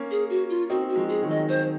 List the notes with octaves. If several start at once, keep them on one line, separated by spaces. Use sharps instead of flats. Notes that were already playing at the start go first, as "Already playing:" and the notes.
Already playing: A#3 C#4
G#4
F#4
F4
C4 D#4 F#4
F#4
F3 G#3
G#4
D#3 F#3
D#5
C5